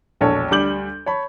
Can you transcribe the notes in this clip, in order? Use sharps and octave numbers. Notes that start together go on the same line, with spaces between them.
E1 A#1 A4 C#5
D2 G3 D6 G6 F#7
C#5 A5 B5